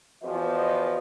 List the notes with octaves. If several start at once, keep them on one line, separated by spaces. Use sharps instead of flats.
E2 F3 F#4 B4 D#5